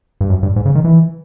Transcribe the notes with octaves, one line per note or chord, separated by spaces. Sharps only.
G2
F#2
G2
G#2
C#3
D#3
E3